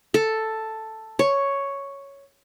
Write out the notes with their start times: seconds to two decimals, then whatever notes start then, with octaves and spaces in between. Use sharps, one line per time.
0.14 A4
1.19 C#5